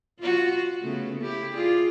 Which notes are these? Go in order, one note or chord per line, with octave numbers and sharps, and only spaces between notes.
F4 F#4
C#3 A3 B3
E4 G4
F4 G#4 D5